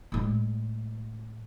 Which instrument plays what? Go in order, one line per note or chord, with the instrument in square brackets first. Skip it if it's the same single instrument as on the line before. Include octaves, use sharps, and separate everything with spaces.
[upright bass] A2 G#3